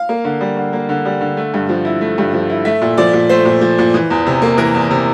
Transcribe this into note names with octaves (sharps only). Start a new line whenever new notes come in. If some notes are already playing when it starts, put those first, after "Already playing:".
Already playing: F5
A#3
D3
G3
D3
A#3
D3
G3
D3
A3
G2
F3
E4
A3
G2
F3
E4
A3 E5
A#2
F3 D5
A#2
A3 C5
A#2
F3
A#2
E3
E2
C3
A#3
E3 A#4
E2
C3